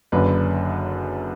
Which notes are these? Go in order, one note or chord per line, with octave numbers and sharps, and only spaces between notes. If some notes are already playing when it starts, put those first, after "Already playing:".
F#1 F#2 D3 B4